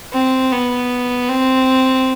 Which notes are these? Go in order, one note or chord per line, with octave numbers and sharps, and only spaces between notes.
C4
B3
C4